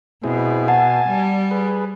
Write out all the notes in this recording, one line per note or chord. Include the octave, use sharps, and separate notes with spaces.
B2 C4 E4 G#4
F#5 G#5 A5
G3
G#4 B4